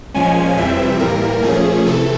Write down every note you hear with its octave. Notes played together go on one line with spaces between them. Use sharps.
A#2 F3 G#3 C#4 G#5
F2 C3 E3 G3 C4 E5
A2 E3 G3 A#3 A#4
A#2 F3 A3 C#4 G#4
C3 E3 A3 A4